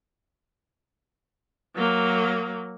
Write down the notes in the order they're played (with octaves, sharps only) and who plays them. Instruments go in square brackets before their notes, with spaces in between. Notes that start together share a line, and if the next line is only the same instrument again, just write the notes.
[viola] F#3 A#3